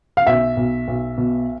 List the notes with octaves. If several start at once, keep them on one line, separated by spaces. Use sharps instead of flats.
F5
B1 E5
B1
B1
B2